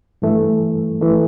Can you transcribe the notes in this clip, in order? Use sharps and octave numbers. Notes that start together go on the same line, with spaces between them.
G2 E3 A3
E3 A3